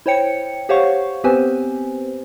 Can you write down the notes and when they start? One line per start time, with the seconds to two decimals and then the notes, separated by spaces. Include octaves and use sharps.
0.06 E4 C5 C#5 G5 C#7
0.69 G4 C5 C#5 F5 F#5 C#6
1.24 B3 C4 G4 B4 C5 G#5